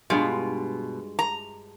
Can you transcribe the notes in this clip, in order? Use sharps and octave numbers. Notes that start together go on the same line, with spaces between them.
G2 B2 G#3 F4
A#5